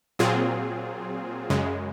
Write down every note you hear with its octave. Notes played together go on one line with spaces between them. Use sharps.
A#2 F#3 C4 F4 G#4
F#2 C#3 G#3